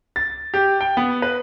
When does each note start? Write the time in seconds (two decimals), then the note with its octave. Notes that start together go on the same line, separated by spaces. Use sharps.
0.16 A6
0.54 G4
0.81 G5
0.97 B3
1.22 B4